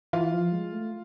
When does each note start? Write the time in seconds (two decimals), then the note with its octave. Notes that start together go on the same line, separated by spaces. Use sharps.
0.13 E3 F4
0.34 F3
0.52 G#3
0.72 A3